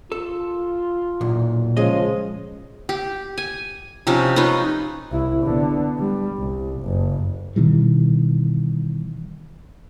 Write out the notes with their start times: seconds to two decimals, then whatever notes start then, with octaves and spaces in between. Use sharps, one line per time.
0.12 F4 A4
1.21 B1 E2 A#2
1.77 C#3 F3 G#3 D#5
2.89 G4
3.38 G#5
4.07 C3 F3 C#4 D#4
4.36 D#4 F4 B4 C#5
5.11 C2 E4
5.43 D3 B3
5.98 G3
6.37 C2
6.81 F#1
7.56 B2 D#3 E3 G3